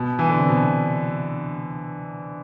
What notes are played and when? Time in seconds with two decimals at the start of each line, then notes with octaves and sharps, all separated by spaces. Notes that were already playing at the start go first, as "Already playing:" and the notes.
Already playing: B2
0.19 E3
0.29 D3
0.38 C3
0.49 B2